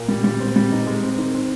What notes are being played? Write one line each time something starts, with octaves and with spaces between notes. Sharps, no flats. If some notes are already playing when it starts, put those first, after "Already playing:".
Already playing: A#2
G3
G3
C4
G3
D#4
G#3
C4
D#3
C4